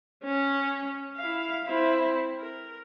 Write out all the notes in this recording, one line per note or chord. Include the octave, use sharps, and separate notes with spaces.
C#4
E4 F5
C4 E4
A#4